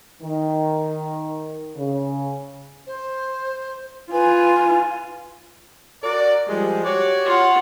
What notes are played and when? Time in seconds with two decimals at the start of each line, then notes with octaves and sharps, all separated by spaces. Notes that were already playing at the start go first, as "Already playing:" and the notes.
0.22 D#3
1.76 C#3
2.87 C5
4.12 F4 B4 G#5
6.03 F#4 A#4 D5
6.48 F3 G3 G#3
6.85 F#4 G4 C#5 D5
7.25 F4 F#5